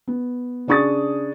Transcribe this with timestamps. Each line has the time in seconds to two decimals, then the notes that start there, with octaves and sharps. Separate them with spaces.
0.08 B3
0.67 C#3 D4 G#4 C#6 D#6 A6